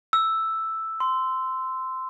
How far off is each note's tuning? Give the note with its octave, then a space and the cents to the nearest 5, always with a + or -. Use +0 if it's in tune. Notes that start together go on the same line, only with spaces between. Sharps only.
E6 +0
C6 -15